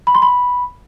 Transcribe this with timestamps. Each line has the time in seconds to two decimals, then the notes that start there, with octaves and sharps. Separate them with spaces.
0.07 B5
0.15 C6
0.22 B5